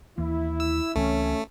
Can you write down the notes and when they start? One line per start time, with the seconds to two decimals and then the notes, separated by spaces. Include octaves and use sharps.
0.18 D#2 E3 A#3 E4
0.60 E6
0.96 C#2 E3 A3 C4 C#4